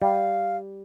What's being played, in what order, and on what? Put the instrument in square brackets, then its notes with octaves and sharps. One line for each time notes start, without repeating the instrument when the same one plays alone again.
[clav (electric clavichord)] G3 [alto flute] F5